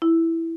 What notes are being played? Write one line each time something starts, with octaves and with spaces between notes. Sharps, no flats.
E4